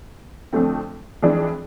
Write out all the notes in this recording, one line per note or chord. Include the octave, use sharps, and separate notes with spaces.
F2 D3 A3 C4
F2 E3 G#3 D4